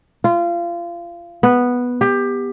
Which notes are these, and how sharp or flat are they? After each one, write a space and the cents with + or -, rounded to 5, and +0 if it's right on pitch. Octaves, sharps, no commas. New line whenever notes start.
F4 -25
B3 -5
G4 +20